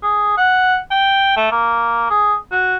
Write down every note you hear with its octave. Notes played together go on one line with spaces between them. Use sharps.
G#4
F#5
G5
A3
A#3
G#4
F#4